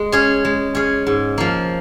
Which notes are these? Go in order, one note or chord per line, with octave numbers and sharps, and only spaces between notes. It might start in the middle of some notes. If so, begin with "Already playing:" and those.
Already playing: G#3
C#4 G#4
G#3
C#4 G#4
G#2
F3 A#3